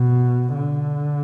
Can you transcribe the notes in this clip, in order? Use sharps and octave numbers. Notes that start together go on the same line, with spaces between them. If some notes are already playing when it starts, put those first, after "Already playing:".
Already playing: B2
D3